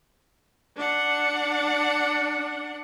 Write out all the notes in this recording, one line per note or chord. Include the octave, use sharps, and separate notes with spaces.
D4 F#5